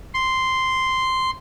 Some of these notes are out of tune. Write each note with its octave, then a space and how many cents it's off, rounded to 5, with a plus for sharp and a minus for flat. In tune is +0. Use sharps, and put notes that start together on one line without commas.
C6 -5